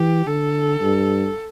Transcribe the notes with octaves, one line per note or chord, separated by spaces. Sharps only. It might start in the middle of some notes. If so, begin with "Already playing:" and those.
Already playing: E3 G4
D3 A4
G2